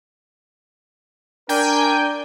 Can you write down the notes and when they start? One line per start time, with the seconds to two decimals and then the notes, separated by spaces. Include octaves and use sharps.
1.49 D4 A#4 G5 G#5 G6